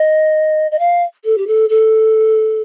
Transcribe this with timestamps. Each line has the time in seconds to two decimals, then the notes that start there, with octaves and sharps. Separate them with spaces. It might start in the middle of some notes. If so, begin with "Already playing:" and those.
Already playing: D#5
0.71 D#5
0.79 F5
1.24 A4
1.37 G4
1.47 A4
1.69 A4